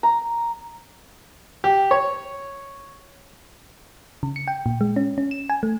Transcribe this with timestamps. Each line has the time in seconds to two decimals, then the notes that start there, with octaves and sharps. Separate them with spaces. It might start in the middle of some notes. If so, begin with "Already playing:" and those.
0.03 A#5
1.64 G4
1.91 C#5
4.23 C#3
4.36 C#7
4.48 G5
4.66 A#2
4.81 G#3
4.96 C#4
5.18 C#4
5.31 E7
5.50 G#5
5.63 A3